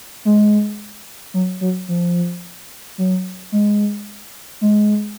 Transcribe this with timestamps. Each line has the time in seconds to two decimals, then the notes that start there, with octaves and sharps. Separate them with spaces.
0.25 G#3
1.34 F#3
1.61 F#3
1.88 F3
2.98 F#3
3.52 G#3
4.61 G#3